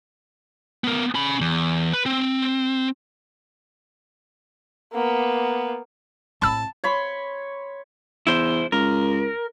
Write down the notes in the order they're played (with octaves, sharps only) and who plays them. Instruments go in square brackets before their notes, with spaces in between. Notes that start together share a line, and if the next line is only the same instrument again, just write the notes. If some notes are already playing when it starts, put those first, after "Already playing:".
[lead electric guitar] B3 A#4
C#4 B5
E2
B4
C4
[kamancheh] A#3 B3
[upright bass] A2 C4 [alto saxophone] A5 [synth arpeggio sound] B5 E6
[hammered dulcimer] C#5 B5 C6
[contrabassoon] E2 [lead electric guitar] E4 C5
[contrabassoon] C#2 [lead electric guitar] A#4